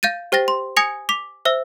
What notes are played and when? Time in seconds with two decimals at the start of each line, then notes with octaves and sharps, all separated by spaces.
0.03 F5 G6 A6 D#7
0.32 G4 C5 G5 A6 A#6
0.48 C6
0.77 G#5 D#6 G#6 A#6 C#7 F7
1.09 D6 B6 F7
1.45 C5 E5 E6